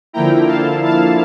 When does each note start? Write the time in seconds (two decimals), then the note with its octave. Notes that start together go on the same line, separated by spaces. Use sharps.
0.13 D3 F3 A#3 E4 G5 A#5
0.48 F5 A5
0.85 F5 A5